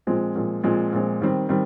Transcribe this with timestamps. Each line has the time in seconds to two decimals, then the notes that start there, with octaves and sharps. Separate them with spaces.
0.07 A#2 F3 G#3 C4
0.35 A#2 F3 G#3 C4
0.64 A#2 F3 G#3 C4
0.93 A#2 F3 G#3 C4
1.22 D#3 G3 C4
1.49 D#3 G3 C4